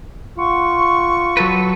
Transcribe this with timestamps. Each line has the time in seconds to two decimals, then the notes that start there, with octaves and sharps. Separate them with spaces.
0.38 F4 F#5 C#6
1.37 F#3 A4 B4